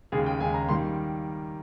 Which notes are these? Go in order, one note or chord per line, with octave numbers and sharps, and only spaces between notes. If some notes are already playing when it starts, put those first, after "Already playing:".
D#2 C#3 G#3 G#4
G5
D#2 C#3 G#3 G#5
A#5
D#3 G3 A#3 C6